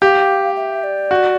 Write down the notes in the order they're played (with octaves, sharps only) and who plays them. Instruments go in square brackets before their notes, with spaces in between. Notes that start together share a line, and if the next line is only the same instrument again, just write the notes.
[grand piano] G4 [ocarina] F5
[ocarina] E5
D5
[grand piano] F#4